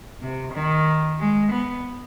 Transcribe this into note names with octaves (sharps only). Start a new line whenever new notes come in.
C3
D#3
G#3
B3